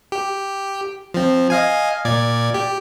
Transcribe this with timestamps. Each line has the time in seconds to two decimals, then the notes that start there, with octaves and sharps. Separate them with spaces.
0.12 G4
1.14 F3 C4
1.50 D#5 F5 G#5
2.05 A#2 D5 G#6
2.54 G4